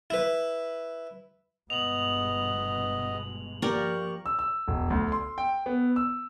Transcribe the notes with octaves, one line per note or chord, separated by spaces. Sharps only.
E4 B4
G1 B2 G#3 B3 D#5 F7 F#7
F3 A#3 G4 A#4 D5 C#6
E6
E6
E1
D2
C6
G5
B3
E6